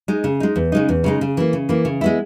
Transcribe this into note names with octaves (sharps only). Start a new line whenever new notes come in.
G#3 D#4
C#3
G#3 D#4
E2
C#3 G#3 D#4
E2
C#3 G#3 D#4
C#3
E3 A#3
C#3
E3 A#3
C#3
G#3 B3 E4